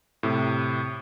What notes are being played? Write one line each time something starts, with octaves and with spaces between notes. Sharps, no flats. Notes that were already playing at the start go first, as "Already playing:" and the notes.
A2 C3